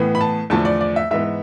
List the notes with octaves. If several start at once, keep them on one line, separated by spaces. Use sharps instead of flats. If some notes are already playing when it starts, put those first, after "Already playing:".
Already playing: A2 E3 B3
B5
A5
E2 D3 F3 A3 A5
D5
D5
E5
G#2 E3 B3 E5